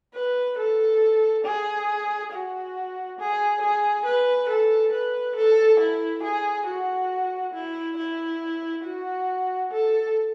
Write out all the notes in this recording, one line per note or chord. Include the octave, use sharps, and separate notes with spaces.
B4
A4
G#4
F#4
G#4
G#4
B4
A4
B4
A4
E4
G#4
F#4
E4
E4
F#4
A4